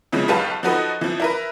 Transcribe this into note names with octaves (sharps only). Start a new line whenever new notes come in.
C#3 E3 F3 G#3
B1 G4 B4 F5 A5
F3 D#4 F#4 A4 B4 D#5
E3 F3
E4 A#4 B4